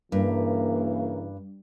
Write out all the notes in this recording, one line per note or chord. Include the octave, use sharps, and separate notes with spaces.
G2 C#3 E3 A#3